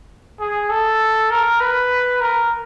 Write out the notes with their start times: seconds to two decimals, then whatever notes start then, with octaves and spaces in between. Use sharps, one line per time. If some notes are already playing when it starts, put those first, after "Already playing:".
0.40 G#4
0.69 A4
1.31 A#4
1.61 B4
2.21 A#4